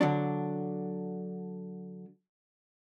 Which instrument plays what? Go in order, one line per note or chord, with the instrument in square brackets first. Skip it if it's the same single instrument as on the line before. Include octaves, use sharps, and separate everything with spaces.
[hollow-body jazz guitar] D3 F#3 D4